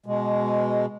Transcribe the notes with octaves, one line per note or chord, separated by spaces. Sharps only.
B2 G#3